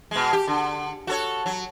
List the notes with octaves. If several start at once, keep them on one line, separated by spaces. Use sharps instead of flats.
B2 G#3
G4
D3
F#4 A4 C#5
F#3